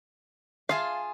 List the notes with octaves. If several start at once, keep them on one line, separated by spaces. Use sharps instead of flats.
F4 G#4 E5 F5 A5 C6